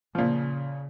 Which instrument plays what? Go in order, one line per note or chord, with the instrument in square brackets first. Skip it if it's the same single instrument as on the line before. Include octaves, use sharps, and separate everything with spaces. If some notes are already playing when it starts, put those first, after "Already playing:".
[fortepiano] A#2 F3 [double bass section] C#3